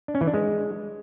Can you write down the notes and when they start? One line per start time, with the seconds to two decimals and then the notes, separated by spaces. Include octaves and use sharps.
0.08 D4
0.15 C#4
0.21 E3
0.27 D4
0.34 G#3